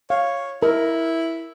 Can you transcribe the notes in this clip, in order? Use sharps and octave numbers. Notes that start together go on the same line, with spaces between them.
C#5 F5
E4 A#4